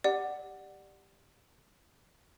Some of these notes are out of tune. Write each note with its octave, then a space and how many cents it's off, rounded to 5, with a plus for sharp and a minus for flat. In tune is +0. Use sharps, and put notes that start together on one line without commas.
G4 +0 D5 +15 F#5 +10